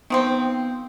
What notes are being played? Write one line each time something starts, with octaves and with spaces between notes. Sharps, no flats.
D#3 F3 B3 C4